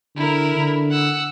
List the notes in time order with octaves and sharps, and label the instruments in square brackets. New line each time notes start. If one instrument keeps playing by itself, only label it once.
[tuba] D3 [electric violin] E4 A#4
[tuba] D3
[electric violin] F#5 E6